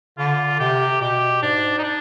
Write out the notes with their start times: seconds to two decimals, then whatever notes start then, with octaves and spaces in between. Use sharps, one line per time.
0.18 D3 F4
0.59 C3 G4
1.01 B2 G4
1.42 G#2 D4
1.78 D#4
1.84 D4